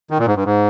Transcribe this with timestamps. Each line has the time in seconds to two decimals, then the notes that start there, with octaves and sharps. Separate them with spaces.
0.11 D#3
0.19 A#2
0.27 G#2
0.36 G2
0.45 G#2